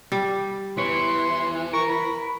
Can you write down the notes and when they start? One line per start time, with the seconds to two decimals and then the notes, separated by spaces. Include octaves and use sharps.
0.12 G3
0.77 E2 E3 E4 C#5 C6
1.73 A#4 C#6
1.88 B5